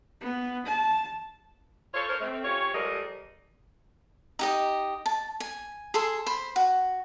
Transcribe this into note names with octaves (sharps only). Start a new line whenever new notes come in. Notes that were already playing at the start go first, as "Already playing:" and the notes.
B3
A5
F4 A4 C5 C#5
A#4 C5 C#5
A3 C4
C#3 C#4 F4 G4 C#5
F3 G3 G#3 A4 A#4 D#5
D#4 G4 D#5
A5
G#5
G#4 A4 C6
C5 B5
F#4